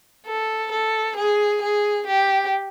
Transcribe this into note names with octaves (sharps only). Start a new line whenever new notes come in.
A4
A4
G#4
G#4
G4